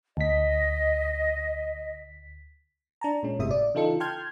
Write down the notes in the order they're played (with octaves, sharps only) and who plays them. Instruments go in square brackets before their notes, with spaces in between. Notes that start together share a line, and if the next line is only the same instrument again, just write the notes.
[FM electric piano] D2 B6 [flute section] D#5
[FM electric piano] D4 A5 A#5
A#2 G#3 C#4
G1 A2 C3 G#3 E5 D#6
D5
C#3 E3 D#4 F4 A4 C#7
G5 A5 C6 F6 G6 G#6